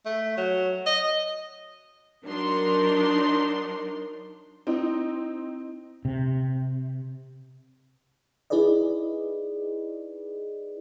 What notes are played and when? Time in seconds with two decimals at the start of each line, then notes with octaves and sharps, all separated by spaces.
0.05 A3
0.37 F#3
0.86 D#5
2.26 F#3 D4 D#4 A#4 C6
4.67 C4 D#4 E4
6.05 C3
8.50 D#4 E4 G#4 B4 D5 D#5